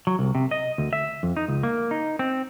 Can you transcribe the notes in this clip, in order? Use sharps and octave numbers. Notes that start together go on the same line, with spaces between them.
F#3
C2
C3
D#5
D2
E5
F2
D#4
C#2
A#3
D#4
C4